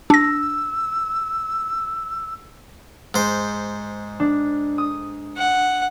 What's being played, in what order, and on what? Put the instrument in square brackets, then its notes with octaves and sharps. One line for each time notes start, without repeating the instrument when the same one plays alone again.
[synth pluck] D4 A#6 [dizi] E6
[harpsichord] G#2 C5
[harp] D4
D#6
[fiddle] F#5